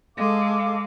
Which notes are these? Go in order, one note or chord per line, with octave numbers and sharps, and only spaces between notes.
G#3 A4 F5 D6